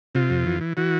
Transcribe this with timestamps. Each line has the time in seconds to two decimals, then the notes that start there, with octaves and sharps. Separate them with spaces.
0.15 C3 F4
0.30 F2
0.46 E3
0.61 E3
0.77 E3 F#4